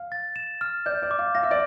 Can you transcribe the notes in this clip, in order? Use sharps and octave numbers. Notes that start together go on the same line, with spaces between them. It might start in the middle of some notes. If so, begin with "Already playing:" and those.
Already playing: F5
A6
E7
F6
D5 G6
D5
D6
F5
F5 A#6
E5
D5